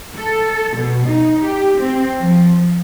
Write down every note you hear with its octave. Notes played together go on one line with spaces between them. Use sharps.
A4
B2
D#4
G4
C4
F3